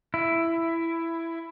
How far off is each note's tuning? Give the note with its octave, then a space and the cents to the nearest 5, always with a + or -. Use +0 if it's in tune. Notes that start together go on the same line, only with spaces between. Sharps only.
E4 +10